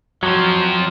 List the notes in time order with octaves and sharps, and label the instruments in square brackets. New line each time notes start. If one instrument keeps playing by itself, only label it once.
[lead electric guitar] F2 F3 [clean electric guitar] F#3